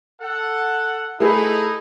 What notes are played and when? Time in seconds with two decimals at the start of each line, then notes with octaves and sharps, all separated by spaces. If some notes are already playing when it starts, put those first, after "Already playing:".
0.20 A4 F#5
1.20 A3 D#4 E4 G#4 B4